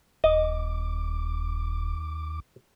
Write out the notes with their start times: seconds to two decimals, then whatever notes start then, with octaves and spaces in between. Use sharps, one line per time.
0.24 D#1 D#2 D#5 D6